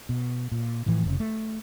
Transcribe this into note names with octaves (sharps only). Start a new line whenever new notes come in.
B2
A#2
A2 E3 F3
F1 C#3
A3